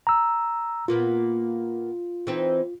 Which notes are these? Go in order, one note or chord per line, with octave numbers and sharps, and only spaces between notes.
A#5 E6
A#2 A#3 B3 F4
E3 C4 D#4